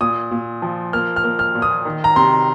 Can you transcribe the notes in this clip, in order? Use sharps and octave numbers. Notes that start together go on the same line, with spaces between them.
A#2 D#6
A#2
F3
A#3 F6
F6
A#3
F6
A#2
D#6
D#3
A#5
C3 C6